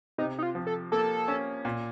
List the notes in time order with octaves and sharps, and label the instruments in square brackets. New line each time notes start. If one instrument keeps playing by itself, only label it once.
[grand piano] C3 [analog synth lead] D#4
[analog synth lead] D#4
F4
[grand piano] F3
[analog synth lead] A4
[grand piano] A#3 [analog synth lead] A4
[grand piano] C#4
A#2